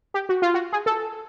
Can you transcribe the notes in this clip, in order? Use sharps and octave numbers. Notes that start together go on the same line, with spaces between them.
G4
F#4
F4
F#4
G#4
A4